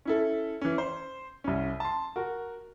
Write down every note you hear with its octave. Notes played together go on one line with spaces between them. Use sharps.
C#4 E4 A4
E3 C#4
C5
C2 C#4
A5 C6
F#4 A#4